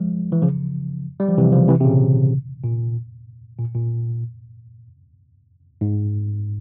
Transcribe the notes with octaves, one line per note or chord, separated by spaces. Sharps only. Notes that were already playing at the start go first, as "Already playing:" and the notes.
Already playing: F3 G#3
E3
C#3 F3
G3
F3
C3 E3
C#3 F3
C3 E3
C3
A#2 C#3
A#2
A#2
A#2
G#2